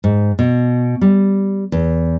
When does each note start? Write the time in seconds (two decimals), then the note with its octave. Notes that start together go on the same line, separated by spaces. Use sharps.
0.04 G#2
0.39 B2
1.01 G3
1.72 E2